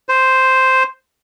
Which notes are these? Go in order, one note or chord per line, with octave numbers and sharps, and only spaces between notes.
C5